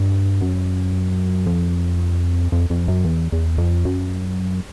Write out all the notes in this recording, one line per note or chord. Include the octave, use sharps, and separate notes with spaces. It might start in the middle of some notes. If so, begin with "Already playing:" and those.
Already playing: G2
F#2
F2
F2
F2
F#2
E2
E2
F2
F#2